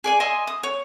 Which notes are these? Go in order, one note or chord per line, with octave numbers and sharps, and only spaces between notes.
G#4 D5 G#5
D#5 E5 G#5 C6
D#6
C#5